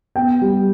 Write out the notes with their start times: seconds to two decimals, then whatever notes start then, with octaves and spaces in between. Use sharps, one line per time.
0.16 B3 G5
0.41 G3